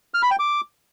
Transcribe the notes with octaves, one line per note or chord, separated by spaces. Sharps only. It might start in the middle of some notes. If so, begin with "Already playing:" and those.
F6
B5
G5
D6